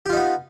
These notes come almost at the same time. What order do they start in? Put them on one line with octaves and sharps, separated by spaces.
G4 F4 D#4 B3